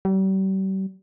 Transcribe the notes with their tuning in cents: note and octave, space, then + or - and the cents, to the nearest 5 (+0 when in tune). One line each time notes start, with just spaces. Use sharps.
G3 -40